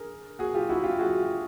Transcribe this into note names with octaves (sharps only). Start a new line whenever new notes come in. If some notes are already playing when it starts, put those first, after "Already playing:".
Already playing: G#4 A#4
F#4 G#4
F4 G4
E4 F#4
F4 G4
F#4 G#4